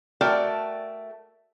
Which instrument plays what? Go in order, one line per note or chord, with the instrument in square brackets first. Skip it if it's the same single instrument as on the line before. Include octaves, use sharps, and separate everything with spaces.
[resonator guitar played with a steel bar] A3 F#4 A#4 D5 G5 A5